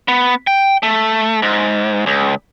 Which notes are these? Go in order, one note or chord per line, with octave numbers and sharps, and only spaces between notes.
B3
G5
A3
G#2
C#2